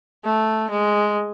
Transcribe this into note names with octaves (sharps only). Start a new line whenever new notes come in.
A3
G#3